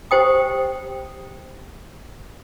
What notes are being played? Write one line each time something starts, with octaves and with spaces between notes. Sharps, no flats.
G4 C5 G5 D#6